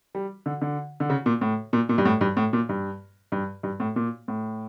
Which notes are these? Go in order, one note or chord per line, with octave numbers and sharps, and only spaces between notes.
G3
D3
D3
D3
C#3
A#2
A2
A#2
A#2
G2
A2
G2
A2
A#2
G2
G2
G2
A2
A#2
A2